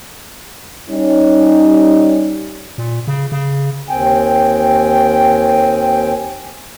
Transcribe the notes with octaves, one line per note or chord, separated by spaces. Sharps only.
G3 C#4 D#4
A#2
C#3
C#3
D#2 C4 G5 G#5